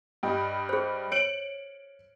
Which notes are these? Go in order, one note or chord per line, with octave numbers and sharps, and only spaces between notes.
G2 G4 D#5
G#4 C5
C#5 C#7 D7 F#7